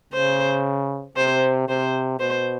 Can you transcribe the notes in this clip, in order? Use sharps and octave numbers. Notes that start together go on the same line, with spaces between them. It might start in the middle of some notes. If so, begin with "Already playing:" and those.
C#3 C5
C3 C5
C3 C5
B2 C5